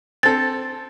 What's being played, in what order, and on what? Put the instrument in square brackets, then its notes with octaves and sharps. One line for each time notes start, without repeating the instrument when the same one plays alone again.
[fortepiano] C4 A4 [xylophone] A6